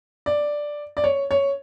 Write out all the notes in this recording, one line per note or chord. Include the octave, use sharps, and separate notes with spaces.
D5
D5
C#5
C#5